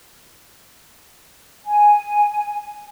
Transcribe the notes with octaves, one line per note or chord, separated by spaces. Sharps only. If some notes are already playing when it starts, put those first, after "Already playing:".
G#5